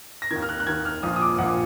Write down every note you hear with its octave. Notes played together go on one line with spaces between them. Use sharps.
A#6
D#3 G#6
D#2
F6
F#6
F#6
D#2 D#3 G#6
F6
A#1 A#2 F3 D#6
D#6
D6
A#1 A#2 F3 F#5